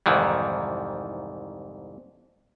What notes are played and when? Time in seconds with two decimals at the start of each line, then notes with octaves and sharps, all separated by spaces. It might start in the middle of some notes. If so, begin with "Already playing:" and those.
0.06 C2 F2 G#2 D#3 E3